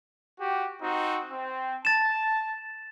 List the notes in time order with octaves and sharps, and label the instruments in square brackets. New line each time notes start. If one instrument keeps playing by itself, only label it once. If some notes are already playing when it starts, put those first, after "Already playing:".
[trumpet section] F#4 G4
C4 D#4 F#4
C4
[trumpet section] A5 [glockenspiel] A6 E7